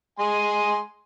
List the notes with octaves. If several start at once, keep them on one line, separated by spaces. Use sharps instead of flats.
G#3 G#5 C6